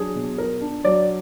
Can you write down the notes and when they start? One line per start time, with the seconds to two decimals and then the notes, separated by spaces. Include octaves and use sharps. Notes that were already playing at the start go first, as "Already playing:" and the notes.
Already playing: F#3 D4 G#4
0.15 B2
0.38 F4 A#4
0.61 D4
0.84 F#3 D5